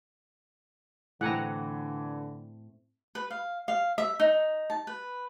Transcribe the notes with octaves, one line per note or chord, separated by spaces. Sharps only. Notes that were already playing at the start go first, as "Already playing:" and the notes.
A2 D3 E3 A3 C4 F#5 G#5 A#5
B4
F5
F5
E5
D#4
A5
B4